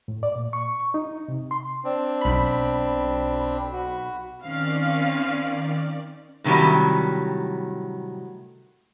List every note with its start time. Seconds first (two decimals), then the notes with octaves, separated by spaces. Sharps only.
0.08 A2
0.23 D5
0.36 A#2
0.53 C#6
0.94 D#4
1.28 C3
1.51 C6
1.84 C4 D4
2.21 B1 B5
3.73 F#4
4.42 D#3 C4 C#4 D5 F5
6.44 A2 C3 D#3 F#3 G3